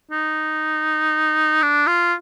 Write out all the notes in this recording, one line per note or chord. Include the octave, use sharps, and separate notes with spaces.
D#4
D4
F4